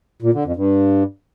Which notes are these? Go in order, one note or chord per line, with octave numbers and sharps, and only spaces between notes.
A#2
D3
F2
G2